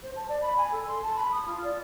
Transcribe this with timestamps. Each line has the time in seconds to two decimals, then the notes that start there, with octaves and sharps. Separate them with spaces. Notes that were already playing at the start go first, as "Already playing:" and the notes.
0.03 C5
0.16 A5
0.29 D5
0.42 B5
0.58 G#5
0.72 A4
0.87 C6
1.02 A5
1.16 B5
1.32 D#6
1.46 F4
1.64 D5